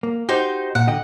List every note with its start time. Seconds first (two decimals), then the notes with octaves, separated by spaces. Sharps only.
0.03 A#3
0.29 D#4 F#4 G4 C5
0.75 A#2 F#5
0.88 D3 D#5 G5